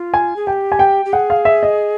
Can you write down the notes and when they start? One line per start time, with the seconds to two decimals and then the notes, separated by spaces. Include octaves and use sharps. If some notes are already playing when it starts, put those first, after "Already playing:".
Already playing: F4
0.14 G#5
0.36 G#4
0.47 G4 G5
0.72 G#5
0.79 G5
1.05 G4
1.13 G#4 F#5
1.30 F5
1.45 E5
1.63 D#5